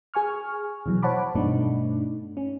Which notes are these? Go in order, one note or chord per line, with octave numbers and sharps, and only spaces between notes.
G#4 G#5 C#6 F6
B2 E3 F#3
C5 C#5 F#5 A5 B5 D6
G2 B2 A3 D4 D#4
C#4